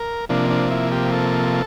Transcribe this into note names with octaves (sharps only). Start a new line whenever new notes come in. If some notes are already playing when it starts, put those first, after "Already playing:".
Already playing: A#4
C3 F3 A#3 D4
D4
E4
G4
A4